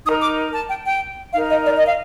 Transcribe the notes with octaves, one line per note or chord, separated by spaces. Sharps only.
D#4 A#4 D#6
D6
A5
G5
G5
D#4 A#4 F5
D#5
D5
D#5
F5